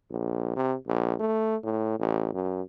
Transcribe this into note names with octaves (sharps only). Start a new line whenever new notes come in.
A#1
C3
A#1
A3
A2
A1
F#2